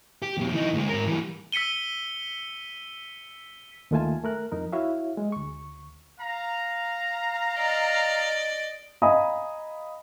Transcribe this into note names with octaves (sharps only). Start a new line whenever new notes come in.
G4
F2 B2
E3 D#4
D2 G#3
G#2 A#4
E3 G3
E6 B6 C#7 D#7 G7
D#2 D#3 A3 F4 G#5 A5
A3 A#4 F#6
F2 D#4 A#4
E4 F#4 C#5 E5 F5
G#3
D2 C#6
F5 A#5
D5 D#5
D#5 F5 G#5 A#5 B5 D#6